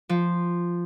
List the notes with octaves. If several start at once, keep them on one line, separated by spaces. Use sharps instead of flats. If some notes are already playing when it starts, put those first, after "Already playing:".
F3